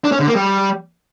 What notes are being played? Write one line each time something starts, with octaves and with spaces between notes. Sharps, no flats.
D4
C#4
D3
A#3
G3